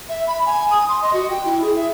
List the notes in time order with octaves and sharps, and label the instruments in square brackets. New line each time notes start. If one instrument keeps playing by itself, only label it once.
[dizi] E5
B5
G#5
D#6
C6
D#5
F#4
G5
E4
G#4
E5